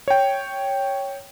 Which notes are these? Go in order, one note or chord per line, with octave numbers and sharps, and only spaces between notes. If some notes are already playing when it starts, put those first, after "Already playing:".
C#5 G5